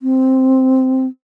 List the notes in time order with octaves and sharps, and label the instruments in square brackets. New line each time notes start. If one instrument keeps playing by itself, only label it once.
[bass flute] C4